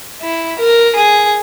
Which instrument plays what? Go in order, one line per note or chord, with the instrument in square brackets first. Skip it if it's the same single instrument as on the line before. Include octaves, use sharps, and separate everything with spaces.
[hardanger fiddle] E4
A#4
G#4